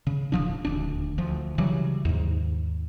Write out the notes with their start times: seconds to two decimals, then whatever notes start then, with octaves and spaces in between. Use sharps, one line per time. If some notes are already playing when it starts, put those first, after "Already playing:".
0.07 C#3
0.32 D1 C#2 F3 D4
0.65 D#1 D2 D4
1.18 D2 F3
1.58 C#3 E3 F#3 G3
2.05 D#2 G#2